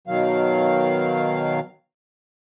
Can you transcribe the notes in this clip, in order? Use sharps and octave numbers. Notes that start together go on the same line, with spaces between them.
B2 D#3 F#3 F5